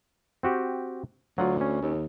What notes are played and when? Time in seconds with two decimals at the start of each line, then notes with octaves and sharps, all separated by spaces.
0.43 C4 F#4 G4
1.38 D2 F#3 F4
1.61 C#4
1.82 D#2